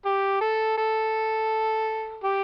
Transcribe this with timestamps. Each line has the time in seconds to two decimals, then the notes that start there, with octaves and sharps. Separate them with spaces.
0.05 G4
0.41 A4
0.78 A4
2.24 G4